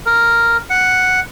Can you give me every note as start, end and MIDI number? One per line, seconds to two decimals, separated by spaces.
0.06 0.57 70
0.70 1.20 78